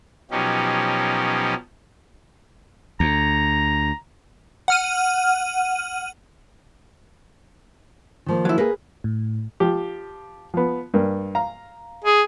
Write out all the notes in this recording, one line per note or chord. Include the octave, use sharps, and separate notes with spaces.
B2 F3 F#3 C#4 D#4 G4
D2 A#5
F#5 F6 D#7
D#3 F3 A#3
F#3 E4
A#3 G#4 B4
A2
F3 G4
F3 B3
G2 A#3
F5 A#5
G#4